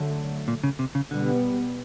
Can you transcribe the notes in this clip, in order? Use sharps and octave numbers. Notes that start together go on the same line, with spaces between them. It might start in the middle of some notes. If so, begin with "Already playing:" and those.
Already playing: D3 F#3 A3
A#2
C#3
C3
C#3
B2 D3 G3 B3